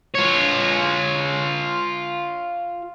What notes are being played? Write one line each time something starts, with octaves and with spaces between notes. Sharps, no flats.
F4 C#5